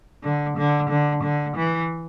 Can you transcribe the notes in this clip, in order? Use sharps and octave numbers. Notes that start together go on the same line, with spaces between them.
D3
D3
D3
D3
E3